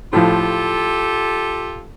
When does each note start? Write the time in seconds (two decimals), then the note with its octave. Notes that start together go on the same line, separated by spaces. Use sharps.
0.13 A2 F3 F4 G4 A4